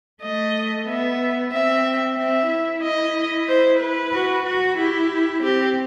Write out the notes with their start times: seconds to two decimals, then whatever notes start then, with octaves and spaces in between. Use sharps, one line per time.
0.22 A3 D#5
0.87 B3 E5
1.53 C4 E5
2.18 C4 E5
2.51 E4
2.83 D#5
3.48 C5
3.80 B4
4.13 F#4
4.45 F#4
4.77 E4 G4
5.42 C4 G4